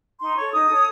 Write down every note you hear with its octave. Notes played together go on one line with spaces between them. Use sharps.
D#4 C6
A4 C#5 C#6
D#4 D#6
A4 C#5